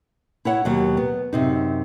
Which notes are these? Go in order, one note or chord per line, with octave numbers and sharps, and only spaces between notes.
E4 C#5 F#5
D#2 B2 F#3
B3
F#2 C3 D#4